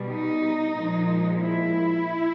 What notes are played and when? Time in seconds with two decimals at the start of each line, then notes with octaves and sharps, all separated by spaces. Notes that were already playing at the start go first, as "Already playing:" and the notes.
Already playing: B2 G3
0.10 D#4
0.75 A#2 F3 G#3
1.40 E4